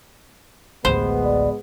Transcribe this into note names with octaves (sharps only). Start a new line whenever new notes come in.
A1 D2 G#3 B3 C5
D5